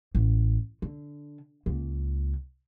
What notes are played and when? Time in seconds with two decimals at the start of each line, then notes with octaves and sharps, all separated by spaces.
0.15 A1
0.82 D3
1.66 C#2 A#3